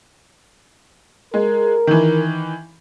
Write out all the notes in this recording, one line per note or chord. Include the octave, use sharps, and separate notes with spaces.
G#3 A#4
D#3 E3